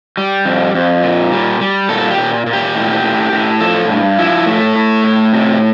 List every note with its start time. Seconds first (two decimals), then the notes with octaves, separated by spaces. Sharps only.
0.17 G3
0.45 F2
0.74 F2
1.03 A#2
1.32 G3
1.61 G3
1.89 A#2 A4
2.10 G4
2.18 A#2
2.46 A#2
2.53 G4
2.75 A2
3.03 A2
3.32 A2
3.60 F3 A4
3.89 G2
4.18 F3 E4
4.46 A2 A3
4.76 A2
5.04 A2
5.33 C3